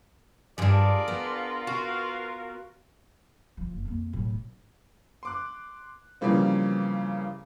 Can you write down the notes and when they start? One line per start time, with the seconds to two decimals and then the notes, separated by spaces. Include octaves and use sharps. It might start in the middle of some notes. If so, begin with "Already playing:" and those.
0.58 G2 G3 D4 F4 G#4 A#4 D5
1.08 B3
1.67 F#4 F5
3.57 F3
3.71 F#1
3.85 F2 A#3
4.13 A2 F#3
4.30 D#4
5.23 C6 D6 F#6
6.21 C#3 E3 F3 G3 A#3 C4